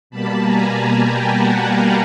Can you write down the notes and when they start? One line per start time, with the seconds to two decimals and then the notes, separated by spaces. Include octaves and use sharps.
0.10 B2 G3 A#3 A5 B5
0.42 G#5 A#5
0.72 G#5 A#5
1.04 G5 A5
1.35 F#5 G#5
1.65 F5 G5